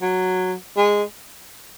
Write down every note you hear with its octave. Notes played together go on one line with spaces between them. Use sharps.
F#3
G#3